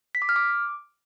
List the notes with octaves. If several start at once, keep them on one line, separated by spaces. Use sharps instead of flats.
B6
D6
F6
D6